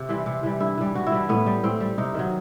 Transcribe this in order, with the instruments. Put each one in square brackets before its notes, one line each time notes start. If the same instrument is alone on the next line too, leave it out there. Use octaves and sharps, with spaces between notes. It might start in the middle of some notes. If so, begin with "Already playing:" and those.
Already playing: [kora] C3
E3 G3 C4
C3
E3 G3
G2 E4
E3 G3
G2 F#4
E4
E3 G3
A2 B3
G3
A2 C4
G3
C3 D#4
D#3 F#3